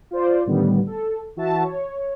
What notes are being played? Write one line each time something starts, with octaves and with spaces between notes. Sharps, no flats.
F4 C5 D5
A2 D3 D#3 G3 B3
A4
E3 F#4 E5 A5
C#5